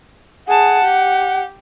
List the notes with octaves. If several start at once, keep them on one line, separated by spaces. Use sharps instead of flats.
G#4 F#5 A5
G4